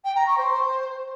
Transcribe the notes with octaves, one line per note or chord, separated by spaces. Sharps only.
G5
A#5
C#6
C5